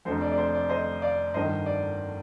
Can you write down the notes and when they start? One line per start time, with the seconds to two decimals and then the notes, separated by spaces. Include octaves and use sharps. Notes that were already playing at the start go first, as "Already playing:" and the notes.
0.05 F1 F2 D3 A3 C4 C5
0.21 D5
0.32 D5
0.38 C5
0.54 D5
0.69 C5 D#5
1.02 D5 F5
1.34 G1 G2 D#3 C5 D#5
1.66 D5